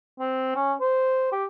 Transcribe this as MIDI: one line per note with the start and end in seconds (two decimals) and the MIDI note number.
0.20 0.51 60
0.55 0.73 61
0.81 1.31 72
1.32 1.45 67